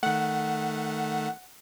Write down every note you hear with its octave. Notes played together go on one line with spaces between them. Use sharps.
D#3 A3 F#5